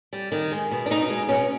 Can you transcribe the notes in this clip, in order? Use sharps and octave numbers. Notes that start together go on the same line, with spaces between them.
G3
D#3
G#3
B2
D4
B2 D#4
G#3
B2 C#4